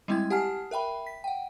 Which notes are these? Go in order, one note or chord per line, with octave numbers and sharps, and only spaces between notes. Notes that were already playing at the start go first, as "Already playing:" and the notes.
G3 G#3 C4 E4 G5 G#6
G4 F#5 G#5 A5 F6 C7
A#4 E5 G5 B5
B6
F#5 G5